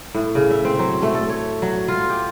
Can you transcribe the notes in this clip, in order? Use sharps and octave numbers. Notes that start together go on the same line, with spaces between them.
A2
C#3
E5
C4
F#3
A3
A4
C#5
F#3
F4
G4